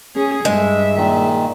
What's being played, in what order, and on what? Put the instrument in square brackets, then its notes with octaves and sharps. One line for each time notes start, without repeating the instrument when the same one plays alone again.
[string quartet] C#4 G#4
[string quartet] G2 E5 [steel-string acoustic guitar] G#3
[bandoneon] A#2 D#3